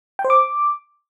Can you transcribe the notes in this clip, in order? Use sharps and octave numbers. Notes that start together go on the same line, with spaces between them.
G5
C5
D6